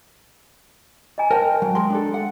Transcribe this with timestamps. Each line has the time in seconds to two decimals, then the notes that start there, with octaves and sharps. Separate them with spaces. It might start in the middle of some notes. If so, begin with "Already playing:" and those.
1.18 D#5 G#5 A#5
1.31 A#4 C5 G5 A5
1.62 F#3
1.75 G#3 A#4 C6
1.90 D4 A4
2.14 F#5